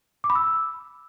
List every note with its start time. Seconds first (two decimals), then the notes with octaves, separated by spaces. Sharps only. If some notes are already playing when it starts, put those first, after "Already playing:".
0.24 D6
0.30 B5
0.35 E6